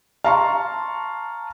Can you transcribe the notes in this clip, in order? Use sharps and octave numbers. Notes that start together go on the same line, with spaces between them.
F5 A5 A#5 C6 C#6